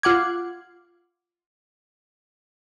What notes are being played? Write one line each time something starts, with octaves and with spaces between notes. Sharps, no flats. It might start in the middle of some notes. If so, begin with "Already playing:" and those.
F4 F#5 D6 G#6